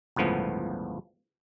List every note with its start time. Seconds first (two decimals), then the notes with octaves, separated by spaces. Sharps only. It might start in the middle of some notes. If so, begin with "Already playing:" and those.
0.16 G1 C#2 A2 F3 B3